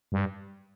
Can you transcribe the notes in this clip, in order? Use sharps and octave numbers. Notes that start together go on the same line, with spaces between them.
G2